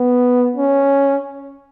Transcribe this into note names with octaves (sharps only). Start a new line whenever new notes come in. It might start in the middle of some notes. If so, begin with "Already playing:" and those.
Already playing: B3
C#4